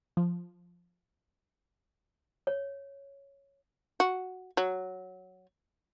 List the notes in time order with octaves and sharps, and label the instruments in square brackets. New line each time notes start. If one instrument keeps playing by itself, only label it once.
[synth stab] F3
[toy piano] C#5
[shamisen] F#4
F#3